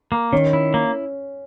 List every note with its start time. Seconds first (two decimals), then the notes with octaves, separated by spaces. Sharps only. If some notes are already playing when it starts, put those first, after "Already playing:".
0.12 A#3
0.32 D#3 C#4
0.53 E4
0.74 A#3